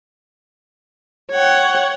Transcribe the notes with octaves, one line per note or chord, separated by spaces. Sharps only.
C#5 F#5 G5